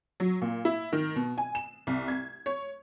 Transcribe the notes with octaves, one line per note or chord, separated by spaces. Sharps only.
F#3
A#2
E4
D#3
B2
G#5
E7
C2
G#6
C#5